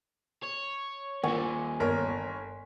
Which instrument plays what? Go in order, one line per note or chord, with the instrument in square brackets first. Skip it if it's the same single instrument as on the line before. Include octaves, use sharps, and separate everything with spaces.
[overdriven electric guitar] C#5
[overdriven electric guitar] D#2 A#2 [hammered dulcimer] G#5 [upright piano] C#6
[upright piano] G1 A#4 C#5